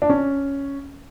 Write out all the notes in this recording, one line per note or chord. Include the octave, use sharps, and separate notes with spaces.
D4
C#4